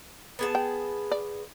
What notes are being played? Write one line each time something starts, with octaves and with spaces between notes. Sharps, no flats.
B3 G#4 A5
G5
D5